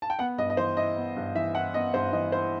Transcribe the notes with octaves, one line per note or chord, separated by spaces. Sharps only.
A5
G5
B3 F#5
G2 D#5
D#5
E3 C5
E4 D#5
B3
G2
E3 E5
E4 F#5
B3 D#5
G2 C5
E3 D#5
E4 C5